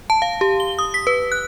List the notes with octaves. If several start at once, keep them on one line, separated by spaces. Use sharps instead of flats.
A5
F5
G4
G7
D#6
B6
B4
F#6